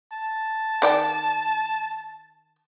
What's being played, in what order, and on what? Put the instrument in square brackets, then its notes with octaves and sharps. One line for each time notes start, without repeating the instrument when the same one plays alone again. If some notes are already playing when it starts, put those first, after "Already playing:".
[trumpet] A5
[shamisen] D#3 D5 G5